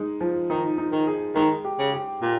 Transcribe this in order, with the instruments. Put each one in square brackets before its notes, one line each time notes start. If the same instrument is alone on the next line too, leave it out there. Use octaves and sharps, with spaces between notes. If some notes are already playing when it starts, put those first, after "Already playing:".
Already playing: [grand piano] G#3 D#4
F3
[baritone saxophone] D#3 [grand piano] D#4
[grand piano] D#4
[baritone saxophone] D#3
[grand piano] G#4
[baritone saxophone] D#3 [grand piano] G#3
[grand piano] G4
[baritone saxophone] C#3
[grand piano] G4
[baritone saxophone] A#2 [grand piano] G4